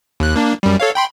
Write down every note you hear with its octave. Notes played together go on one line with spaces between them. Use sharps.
D#2 F#6
A#3 D4
F#2 G3
A4 C#5 F5
G5 B5 C6